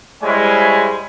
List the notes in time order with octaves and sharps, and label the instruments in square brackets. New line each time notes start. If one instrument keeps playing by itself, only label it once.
[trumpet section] G3 G#3 E4 C5 C#5 G#5